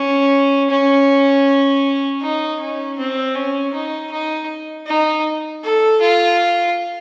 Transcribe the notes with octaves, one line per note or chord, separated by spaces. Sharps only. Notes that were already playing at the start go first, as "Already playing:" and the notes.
Already playing: C#4
C#4
D#4
C#4
C4
C#4
D#4
D#4
D#4
A4
F4